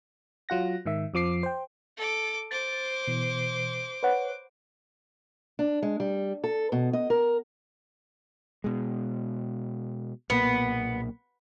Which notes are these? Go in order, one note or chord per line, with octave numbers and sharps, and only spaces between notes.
F#3 F4 F#5 A#6
G#2 D#3 E5
F2 F3 D6 C7
C5 G5
A4 D6
C5 D6 A6
B2 E3
B4 C#5 F#5
D4
G#3
G3
A4
B2
D#5
A#4
B2 G#3
B1 A#2 A#3 B3